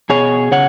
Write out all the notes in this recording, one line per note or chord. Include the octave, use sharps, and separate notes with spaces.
B2 G#4 C#5
C#3 C#5 F#5